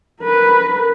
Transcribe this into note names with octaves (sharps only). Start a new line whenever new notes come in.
A#4 B4